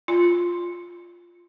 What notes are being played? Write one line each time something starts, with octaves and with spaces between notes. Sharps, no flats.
F4